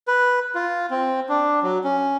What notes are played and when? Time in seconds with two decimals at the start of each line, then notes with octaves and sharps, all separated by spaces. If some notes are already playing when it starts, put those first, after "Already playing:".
0.08 B4
0.55 F4
0.91 C4
1.29 D4
1.63 F#3
1.84 C#4